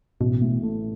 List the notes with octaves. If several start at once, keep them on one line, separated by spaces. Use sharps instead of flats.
A1 B2
A2
A3